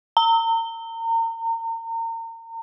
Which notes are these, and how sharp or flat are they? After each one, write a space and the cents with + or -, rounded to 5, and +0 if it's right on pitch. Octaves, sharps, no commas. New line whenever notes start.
A#5 -35